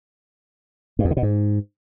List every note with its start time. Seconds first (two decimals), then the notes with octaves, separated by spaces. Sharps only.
0.99 G2
1.05 E2
1.11 D3
1.17 B2
1.23 G#2